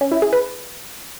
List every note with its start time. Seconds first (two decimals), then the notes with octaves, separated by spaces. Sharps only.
0.01 C#4
0.12 E4
0.22 G#4
0.33 B4